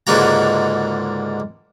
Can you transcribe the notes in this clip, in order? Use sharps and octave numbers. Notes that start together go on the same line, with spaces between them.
C#2 G#2 D3 A#3 F#4 A#5